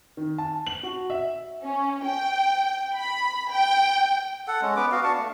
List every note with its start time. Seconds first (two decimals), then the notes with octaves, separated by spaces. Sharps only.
0.17 D#3
0.38 A5
0.67 F#7
0.83 F#4
1.10 E5
1.63 C#4
2.04 G5
2.95 B5
3.51 G5
4.47 A4 F#5
4.62 G#3 C#4
4.76 B3 B4 D6
4.92 B3 F#4 F5
5.03 D4 A5 C#6
5.18 A3